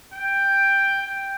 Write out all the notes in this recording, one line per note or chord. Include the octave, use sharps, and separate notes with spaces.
G5
G5